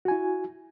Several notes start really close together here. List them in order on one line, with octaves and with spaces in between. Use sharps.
F#4 G#5 E4